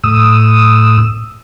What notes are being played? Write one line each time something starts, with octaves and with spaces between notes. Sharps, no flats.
A2 D#6 E6